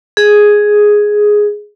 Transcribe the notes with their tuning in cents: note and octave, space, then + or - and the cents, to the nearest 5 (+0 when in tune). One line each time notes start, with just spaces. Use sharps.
G#4 +5